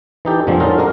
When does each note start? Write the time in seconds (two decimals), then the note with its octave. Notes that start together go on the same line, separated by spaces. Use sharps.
0.25 E3 D#4 G4 A4
0.47 F2 A#2 D3 F3 G#3 C4
0.60 C#4 D#4 F4 F#4 A4 A#4
0.78 G#3 D4 F#4 A#4